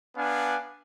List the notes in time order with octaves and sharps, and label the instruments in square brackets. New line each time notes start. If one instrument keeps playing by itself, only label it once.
[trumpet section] B3 D4 F5 G#5